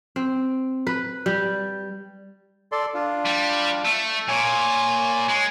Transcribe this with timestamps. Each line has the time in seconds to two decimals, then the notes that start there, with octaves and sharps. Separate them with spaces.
0.16 C4
0.87 B4
1.26 G3
2.72 A4 D5 C6
2.94 D4 F4
3.25 G3
3.85 A3
4.28 A#2 C#5 G#5
5.28 G#3